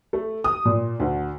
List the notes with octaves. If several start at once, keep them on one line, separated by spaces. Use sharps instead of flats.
A3
D#6
A#2
D2